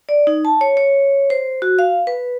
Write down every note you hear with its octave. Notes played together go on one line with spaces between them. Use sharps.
D5
D#4
A5
C#5
C#5
C5
F#4
F5
B4